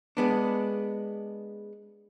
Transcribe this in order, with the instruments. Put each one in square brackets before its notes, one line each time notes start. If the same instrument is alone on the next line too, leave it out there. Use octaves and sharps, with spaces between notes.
[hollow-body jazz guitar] G#3 B3 D4